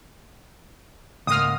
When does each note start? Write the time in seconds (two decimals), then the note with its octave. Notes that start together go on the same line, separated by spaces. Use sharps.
1.27 C#2 G#2 A#3 D#6 F6